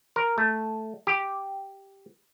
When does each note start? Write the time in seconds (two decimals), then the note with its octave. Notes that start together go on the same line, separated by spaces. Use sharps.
0.16 A#4
0.38 A3
1.07 G4